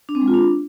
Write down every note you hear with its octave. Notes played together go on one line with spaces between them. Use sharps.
D4
C4
G#3
F4
D4